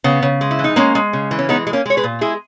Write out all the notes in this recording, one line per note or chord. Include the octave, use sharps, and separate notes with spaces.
C#3 B3
C#3
G#3
E4
E3
D#4
G#3 A#3 C#4
G#3
C#3
E3
C#4
G#3 B3 D#4
G#3
A#3 C#4
G#3 C#5
G#4 B4
A#2
G#3 E4 G#4